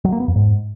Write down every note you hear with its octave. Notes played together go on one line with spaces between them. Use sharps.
F#3
A#3
B3
F2
G#2